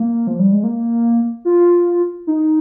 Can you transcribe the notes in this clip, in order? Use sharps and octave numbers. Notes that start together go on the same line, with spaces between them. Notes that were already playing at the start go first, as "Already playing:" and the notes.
Already playing: A#3
F3
G3
G#3
A#3
F4
D#4